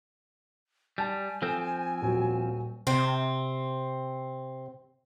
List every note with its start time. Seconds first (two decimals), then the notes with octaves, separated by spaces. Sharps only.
0.98 G3 G#5 A5
1.42 F3 C4 A4
2.02 D#1 F#3
2.87 C3 C4